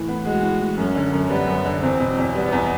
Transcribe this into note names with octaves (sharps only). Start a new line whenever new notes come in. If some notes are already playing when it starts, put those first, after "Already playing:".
Already playing: A2 E3
B3
G#3 F#4
A2
E3
F#2 C#4
D3
F#2
G3 B3
F#2
D3
E2 C4
B2
E2
G3 B3
E2